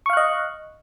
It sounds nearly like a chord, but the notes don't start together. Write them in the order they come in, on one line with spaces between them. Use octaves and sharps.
C#6 F5 F#6 D#5